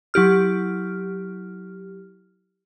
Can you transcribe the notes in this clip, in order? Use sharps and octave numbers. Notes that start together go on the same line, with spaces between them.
F#3 E4 G4 F6